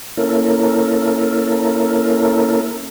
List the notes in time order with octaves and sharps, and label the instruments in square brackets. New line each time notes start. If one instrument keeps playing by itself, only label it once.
[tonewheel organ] A#3 C#4 E4 A4 A#4